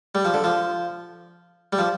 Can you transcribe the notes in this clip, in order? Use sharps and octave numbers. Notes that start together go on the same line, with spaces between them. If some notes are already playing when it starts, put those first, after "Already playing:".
G3
F3
D3
F3
G3
F3